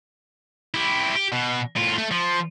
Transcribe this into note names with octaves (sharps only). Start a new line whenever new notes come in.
E4 G4
G4
B2
A2 F4
A3
F3